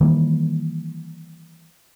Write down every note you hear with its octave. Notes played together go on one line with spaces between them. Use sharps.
D#3 E3 G3 A#3